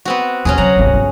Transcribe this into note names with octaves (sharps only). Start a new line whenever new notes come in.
B3 C4 F#4
D#2 A#2 C#4 F#4 G#4
C#3 F#3 F#5 A#5
G1 C2
G1 C#2